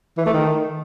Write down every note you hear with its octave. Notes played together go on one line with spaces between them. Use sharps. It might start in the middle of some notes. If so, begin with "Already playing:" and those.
E3
A3
D#3